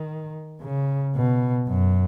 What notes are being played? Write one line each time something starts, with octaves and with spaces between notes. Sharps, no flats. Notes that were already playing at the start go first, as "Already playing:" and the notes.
Already playing: D#3
C#3
B2
F#2